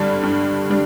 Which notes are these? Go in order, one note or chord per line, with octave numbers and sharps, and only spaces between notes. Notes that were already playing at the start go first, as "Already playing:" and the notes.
Already playing: G2 D3 G3 D4
G2
D3 G3 D4